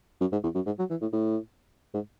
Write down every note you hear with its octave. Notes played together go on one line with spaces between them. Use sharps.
F#2
G#2
E2
F#2
G#2
F#3
E3
A2
A2
G#2